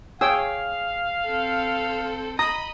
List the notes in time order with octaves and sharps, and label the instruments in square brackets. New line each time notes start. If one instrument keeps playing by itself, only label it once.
[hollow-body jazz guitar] G#4 [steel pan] C#5 G5 E6 [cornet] F5
[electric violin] C4 A4
[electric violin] D#5 B5 [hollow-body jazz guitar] A#5 [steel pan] D#6